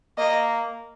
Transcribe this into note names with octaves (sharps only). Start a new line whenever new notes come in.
A#3 D#5